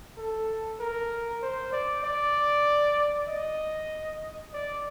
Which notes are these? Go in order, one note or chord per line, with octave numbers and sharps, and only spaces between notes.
A4
A#4
C5
D5
D5
D#5
D5